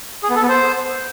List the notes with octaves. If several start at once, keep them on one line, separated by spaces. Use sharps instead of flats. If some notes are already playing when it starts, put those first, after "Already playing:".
G#4
B3
A4
B3
C5